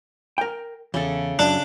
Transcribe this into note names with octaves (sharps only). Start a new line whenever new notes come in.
A#4 G5
E2 C#3 A4
F#2 D4